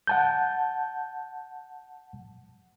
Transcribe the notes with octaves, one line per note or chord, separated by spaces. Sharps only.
F#5 A5 G6